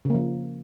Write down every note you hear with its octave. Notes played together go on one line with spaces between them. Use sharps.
C#3 F3 A#3